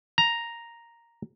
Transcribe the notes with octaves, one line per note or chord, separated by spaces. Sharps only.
A#5